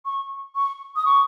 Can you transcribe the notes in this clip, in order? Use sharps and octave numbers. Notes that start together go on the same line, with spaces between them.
C#6
C#6
D#6
C#6